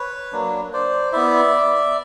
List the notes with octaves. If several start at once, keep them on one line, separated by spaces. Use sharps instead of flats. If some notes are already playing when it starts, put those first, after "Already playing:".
Already playing: B4 C#5
F#3 A#3 D4
C5 D5
B3 E4 D5 E5